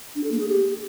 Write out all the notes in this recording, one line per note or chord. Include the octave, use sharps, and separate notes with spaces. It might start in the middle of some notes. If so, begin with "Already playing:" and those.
D4
A4
A#3
G#4
G4